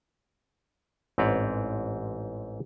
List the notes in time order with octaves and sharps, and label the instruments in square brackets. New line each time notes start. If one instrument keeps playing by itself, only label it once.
[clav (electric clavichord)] A1 G#2 C4 B4 C#5 D5